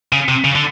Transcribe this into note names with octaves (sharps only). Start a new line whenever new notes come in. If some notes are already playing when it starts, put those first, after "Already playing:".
C#3
C3
C#3
D3